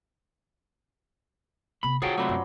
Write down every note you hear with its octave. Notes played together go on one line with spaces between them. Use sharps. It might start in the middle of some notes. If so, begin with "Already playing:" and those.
C3 B3 B5
D#3 F3 F#3 B3 G#4 A4 G5
C3 F#3 A3 D5 B5 C6
F#2